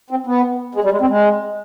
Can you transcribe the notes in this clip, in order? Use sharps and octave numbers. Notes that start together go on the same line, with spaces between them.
C4
B3
G#3
G3
G#3
C4
G#3